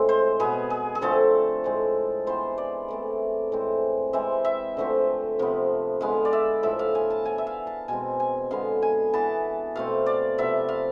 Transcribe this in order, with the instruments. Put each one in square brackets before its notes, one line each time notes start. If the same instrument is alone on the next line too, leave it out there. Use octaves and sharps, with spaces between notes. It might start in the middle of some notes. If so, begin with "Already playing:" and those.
Already playing: [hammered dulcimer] A2 G#3 C4
C5
B2 B3 G#4
G#4
G#4
D3 F3 A3 C4 A4
A2 G#3 C4
E3 B3 C5
D5
E3 A3 C4
A2 G#3 C4
E3 G#3 C4 E5
E5
D3 F3 A3 C4
C3 F3 B3
D3 G#3 B3 F5
D5
E5
A2 F3 B3 E5
F5
G#5
A5
E3 B3 G#5
E5
F5
A5
B2 G#3 C4 G#5
G#5
D3 G#3 B3 F5
G#5
E3 B3 A5
B2 A3 C4 F5
D5
C3 F3 B3 E5
F5